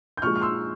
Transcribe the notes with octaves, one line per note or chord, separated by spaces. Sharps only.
G6
A#2 F3 G#3 C#6 F6
F6
C6 E6